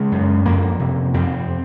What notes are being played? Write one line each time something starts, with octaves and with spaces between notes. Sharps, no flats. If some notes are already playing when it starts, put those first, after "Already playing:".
Already playing: C#3 G#3
F#2
F2 A#3
C3
F2 C4